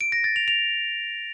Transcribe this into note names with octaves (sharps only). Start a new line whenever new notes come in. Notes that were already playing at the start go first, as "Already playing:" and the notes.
D7
A#6
A6
F7
F7